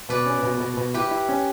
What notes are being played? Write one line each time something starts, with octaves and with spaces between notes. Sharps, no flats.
B2 B4 D5
C#4
B2
B2
B2
E4 G4 B4
E4
C#4